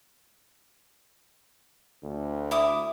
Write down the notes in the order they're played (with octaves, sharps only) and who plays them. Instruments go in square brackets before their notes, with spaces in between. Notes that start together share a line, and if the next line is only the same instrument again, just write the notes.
[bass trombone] D2
[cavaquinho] E4 D6 D#6